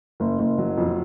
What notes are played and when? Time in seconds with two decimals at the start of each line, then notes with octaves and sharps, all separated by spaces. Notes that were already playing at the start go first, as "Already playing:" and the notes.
0.20 F#1
0.39 F#1
0.58 F#3
0.77 F2